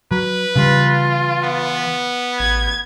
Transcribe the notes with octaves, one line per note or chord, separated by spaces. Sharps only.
F#3 B4
C#3 E3 G3 F4
B3
A1 G#6